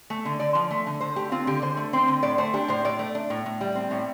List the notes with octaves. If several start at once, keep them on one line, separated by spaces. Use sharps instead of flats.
A3
D3
D3 D5
F3
A3
D3
D3 C5
A3 G4
C4 F4
D3 G4
D3 C5
A3
C4 C5
D3
A2 D5
A3 C5
D4 G4
A2 C5
A2 D5
A3
D4
A2
A2
G3
C4
A2